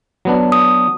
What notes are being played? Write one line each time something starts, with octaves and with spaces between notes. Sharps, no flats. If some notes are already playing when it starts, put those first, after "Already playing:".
F#3 B3 D4
D#6